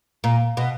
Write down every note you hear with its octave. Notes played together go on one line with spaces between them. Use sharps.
A#2
B2